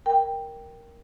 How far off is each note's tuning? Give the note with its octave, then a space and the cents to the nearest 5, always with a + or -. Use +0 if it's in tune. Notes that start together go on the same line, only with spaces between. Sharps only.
A#4 +0 G5 +0